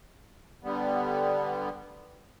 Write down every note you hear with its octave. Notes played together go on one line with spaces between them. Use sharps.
D3 G3 B3